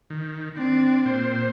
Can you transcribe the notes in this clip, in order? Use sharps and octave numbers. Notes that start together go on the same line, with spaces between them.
D#3
C4 D4
A#2 C5